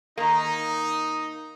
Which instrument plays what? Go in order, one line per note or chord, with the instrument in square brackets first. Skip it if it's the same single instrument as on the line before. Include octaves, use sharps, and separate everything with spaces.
[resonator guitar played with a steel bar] D#3 A#3 [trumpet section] D#4